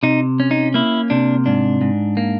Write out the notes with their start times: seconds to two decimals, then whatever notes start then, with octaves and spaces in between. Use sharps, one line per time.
0.03 C3 D#4
0.40 C#4
0.51 D#4
0.74 A#3 E4
1.10 C3 D4
1.46 G#2 D4
1.81 G#2
2.17 A#3